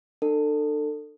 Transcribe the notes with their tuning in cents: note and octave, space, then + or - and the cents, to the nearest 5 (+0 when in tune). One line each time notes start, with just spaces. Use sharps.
D4 +40 A4 +25